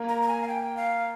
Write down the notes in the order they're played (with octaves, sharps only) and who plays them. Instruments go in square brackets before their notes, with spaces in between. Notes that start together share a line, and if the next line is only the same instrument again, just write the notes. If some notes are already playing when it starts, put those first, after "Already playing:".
Already playing: [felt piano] A#3
[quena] A#5
A#5
G#5
F5
G5
F5